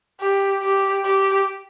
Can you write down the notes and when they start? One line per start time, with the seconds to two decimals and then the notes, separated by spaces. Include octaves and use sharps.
0.20 G4
0.62 G4
1.05 G4